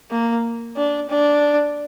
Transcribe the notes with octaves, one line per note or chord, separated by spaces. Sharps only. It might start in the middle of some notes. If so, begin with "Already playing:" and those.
A#3
D4
D4